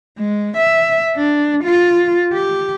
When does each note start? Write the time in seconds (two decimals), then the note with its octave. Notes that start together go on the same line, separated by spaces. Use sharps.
0.18 G#3
0.57 E5
1.16 D4
1.64 F4
2.33 G4